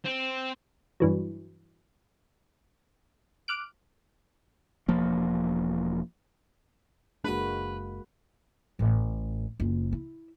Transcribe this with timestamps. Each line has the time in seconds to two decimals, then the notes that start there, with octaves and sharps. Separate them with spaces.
0.05 C4
1.00 G2 E3 F#3
3.48 D6 F6 F#6 D7
4.88 E1 F3 A#3
7.24 F#1 G#3 A#3 D4 F#4 B4
8.79 A1 A2
9.60 F#1 F4
9.93 E4